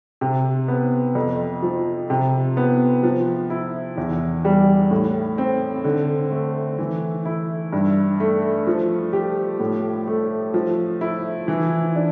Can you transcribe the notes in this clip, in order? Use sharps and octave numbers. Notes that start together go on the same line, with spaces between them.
C3
B3
F2
F3
C3
B3
F3
E4
E2
G3
A2
C4
D3
A3
E3
E4
G2
A3
F3
G4
A2
A3
F3
E4
E3
D4